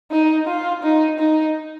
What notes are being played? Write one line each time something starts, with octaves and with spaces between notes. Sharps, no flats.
D#4
F4
D#4
D#4